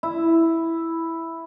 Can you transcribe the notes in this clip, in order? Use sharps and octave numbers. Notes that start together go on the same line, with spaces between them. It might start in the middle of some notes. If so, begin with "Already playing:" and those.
E4